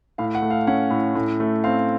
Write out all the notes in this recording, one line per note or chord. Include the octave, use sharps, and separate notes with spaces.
A2 F5
F#5
A3
F5
C#4 F#5
A2
A2
A3
C4 F5